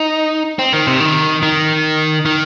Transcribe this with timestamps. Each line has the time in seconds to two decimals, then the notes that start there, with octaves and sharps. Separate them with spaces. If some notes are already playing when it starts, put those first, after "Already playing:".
Already playing: D#4
0.59 C4
0.73 D#3
0.87 C3
1.00 D#3
1.43 D#3
2.25 D#3